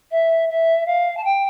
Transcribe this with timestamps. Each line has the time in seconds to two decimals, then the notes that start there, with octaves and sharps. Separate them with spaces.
0.11 E5
0.49 E5
0.86 F5
1.17 A5
1.24 G5